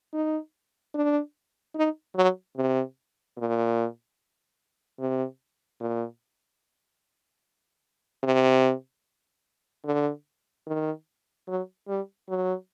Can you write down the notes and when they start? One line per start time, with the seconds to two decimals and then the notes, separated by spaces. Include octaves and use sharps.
0.13 D#4
0.94 D4
1.75 D#4
2.15 F#3
2.56 C3
3.38 A#2
4.99 C3
5.80 A#2
8.23 C3
9.85 D3
10.67 D#3
11.48 F#3
11.88 G3
12.29 F#3